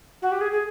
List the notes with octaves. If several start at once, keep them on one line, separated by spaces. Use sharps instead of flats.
F#4
G4
G#4
G#4